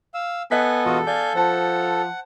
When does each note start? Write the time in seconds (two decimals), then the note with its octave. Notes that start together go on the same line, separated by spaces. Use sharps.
0.14 F5 E6
0.51 B3 A4 D#5 G#5 F#6 B6
0.85 E1 F4 F#4 D#5
1.07 D5 F5 G#5 G6
1.35 F3 C5 F#5 A5